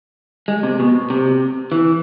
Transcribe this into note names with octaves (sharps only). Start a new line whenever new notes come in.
G#3
C3
B2
C3
E3